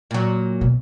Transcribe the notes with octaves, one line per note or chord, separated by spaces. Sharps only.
A#2 F#3
B2